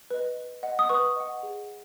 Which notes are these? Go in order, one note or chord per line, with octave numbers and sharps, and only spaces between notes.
B4 D#5
B4
D#5 F#5
D#6
B4 C#6
D#5 F#5
G#4